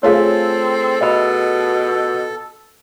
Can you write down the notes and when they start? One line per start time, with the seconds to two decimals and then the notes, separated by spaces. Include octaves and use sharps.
0.03 A3 C4 F4 G#4 A4 C#5 F5
1.01 B2 D#5 E5 B5